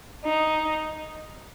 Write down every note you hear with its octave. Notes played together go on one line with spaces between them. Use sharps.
D#4